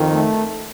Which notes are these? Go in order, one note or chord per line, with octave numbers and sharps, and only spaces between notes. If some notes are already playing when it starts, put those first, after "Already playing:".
Already playing: F2 D#3
A3